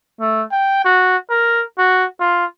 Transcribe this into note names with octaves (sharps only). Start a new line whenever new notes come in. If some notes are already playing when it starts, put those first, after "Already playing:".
A3
G5
F#4
A#4
F#4
F4